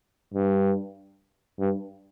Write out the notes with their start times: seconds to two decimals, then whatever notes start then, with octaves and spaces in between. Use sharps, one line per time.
0.34 G2
1.59 G2